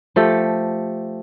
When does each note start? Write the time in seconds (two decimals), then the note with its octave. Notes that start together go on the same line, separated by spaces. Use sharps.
0.16 F3 A3 G4 A4